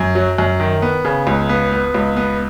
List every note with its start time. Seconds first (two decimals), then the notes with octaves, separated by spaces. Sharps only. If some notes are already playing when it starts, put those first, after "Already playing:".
Already playing: F#2
0.15 F#3
0.38 F#2
0.60 D#3
0.82 B3
1.05 C#3
1.27 C#2
1.49 B3
1.72 B3
1.94 C#2
2.17 B3